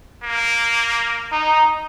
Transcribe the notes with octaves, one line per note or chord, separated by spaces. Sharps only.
A#3
D#4